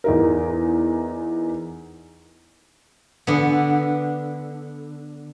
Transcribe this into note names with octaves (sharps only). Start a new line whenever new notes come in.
E2 D#4 A#4
D3 B3